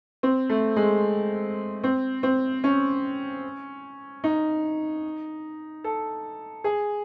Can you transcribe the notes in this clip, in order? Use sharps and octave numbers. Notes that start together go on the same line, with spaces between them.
C4
A3
G#3
C4
C4
C#4
D#4
A4
G#4